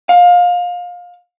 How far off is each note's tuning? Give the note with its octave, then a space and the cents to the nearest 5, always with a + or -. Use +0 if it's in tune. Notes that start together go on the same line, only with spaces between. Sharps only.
F5 +25